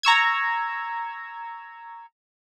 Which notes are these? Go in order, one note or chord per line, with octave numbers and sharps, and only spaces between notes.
A#5 C#6 E6 G#6